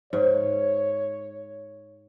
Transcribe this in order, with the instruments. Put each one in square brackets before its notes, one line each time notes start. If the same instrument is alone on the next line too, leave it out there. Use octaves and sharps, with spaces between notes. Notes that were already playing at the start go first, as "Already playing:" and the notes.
[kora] G#2 [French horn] C#5